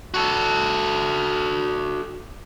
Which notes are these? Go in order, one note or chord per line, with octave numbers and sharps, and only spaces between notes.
F#4 A4